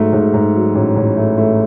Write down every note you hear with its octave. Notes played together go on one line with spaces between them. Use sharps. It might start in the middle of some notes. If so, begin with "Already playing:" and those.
Already playing: G#2 F#3 A3
G#2
G#2
F#3
A1
A1
A3
A3